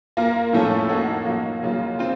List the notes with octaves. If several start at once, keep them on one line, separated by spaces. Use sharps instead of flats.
A#3 F4 A#4
A2 F3 A3 C#4 A4
A#3 D#4 F#4 A4 C#5
F3 A#3 D#4
C#3 F#3 A#3 F4
C4 F4